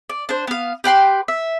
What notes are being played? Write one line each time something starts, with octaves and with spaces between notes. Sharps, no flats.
D5
D4 C5
B3 F5
G4 B4 G5 C6
E5